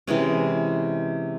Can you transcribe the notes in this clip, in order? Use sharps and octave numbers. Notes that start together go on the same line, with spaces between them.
C3 E3 G#3 C#4